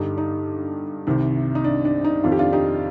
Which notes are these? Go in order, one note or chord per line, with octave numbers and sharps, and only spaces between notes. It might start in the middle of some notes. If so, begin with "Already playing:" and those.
Already playing: G2 D3 D#4 G4
D#4
C2 C3 D#3
D#4
D4
D4
D#4
F2 D#3 F4
G4
D4 F4
D#4 G4